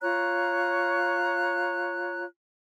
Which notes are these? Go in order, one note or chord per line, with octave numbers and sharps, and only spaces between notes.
F4 C#5 A#5 F#6